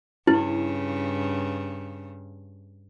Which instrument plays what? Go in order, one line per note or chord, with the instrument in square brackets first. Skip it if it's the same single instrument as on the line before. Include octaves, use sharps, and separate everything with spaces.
[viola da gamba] G2 C#3 [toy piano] E4